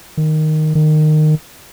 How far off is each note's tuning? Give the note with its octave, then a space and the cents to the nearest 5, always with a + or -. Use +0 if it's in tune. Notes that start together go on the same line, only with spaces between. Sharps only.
D#3 -5
D#3 -20